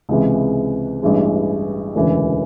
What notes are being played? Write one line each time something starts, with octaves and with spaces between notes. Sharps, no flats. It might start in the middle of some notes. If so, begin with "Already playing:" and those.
C#2 C3 E3 G#3
A1 G2 E3 G#3
E1 D2 C#3 E3